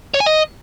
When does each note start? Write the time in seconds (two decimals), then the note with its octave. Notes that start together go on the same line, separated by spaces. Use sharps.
0.14 C#5
0.20 G#5
0.26 D#5